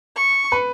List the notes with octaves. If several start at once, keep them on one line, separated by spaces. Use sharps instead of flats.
C#6
B4